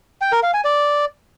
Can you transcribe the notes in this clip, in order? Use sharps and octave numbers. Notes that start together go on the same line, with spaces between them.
G5
A#4
F5
G#5
D5